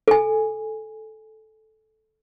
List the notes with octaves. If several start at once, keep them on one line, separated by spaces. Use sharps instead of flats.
A4 G#5